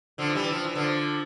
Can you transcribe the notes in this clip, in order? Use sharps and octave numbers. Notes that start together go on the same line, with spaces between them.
D3 F3
E3 G3
F3
E3
D3 F3